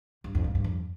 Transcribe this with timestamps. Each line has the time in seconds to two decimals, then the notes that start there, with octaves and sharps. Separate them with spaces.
0.24 G2
0.35 F2
0.44 G#2
0.55 G2
0.64 F2